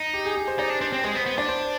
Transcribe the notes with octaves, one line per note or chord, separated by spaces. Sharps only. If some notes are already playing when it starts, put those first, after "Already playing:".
Already playing: D#4
G4
G#4
G#4
C5
D#4 D5
D4
D4 C5
C4
G#3 C5
B3
B3
D4 D5
C5